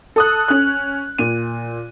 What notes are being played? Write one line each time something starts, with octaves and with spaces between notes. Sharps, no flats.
A4 D#6 F#6
C#4 F#6
A#2 D#7